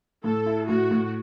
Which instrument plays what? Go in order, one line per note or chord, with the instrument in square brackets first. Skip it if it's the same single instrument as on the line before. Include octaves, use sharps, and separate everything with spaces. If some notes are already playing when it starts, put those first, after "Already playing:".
[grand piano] A2 [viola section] A4
[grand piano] E4
[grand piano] A2 [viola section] F#4
[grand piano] A2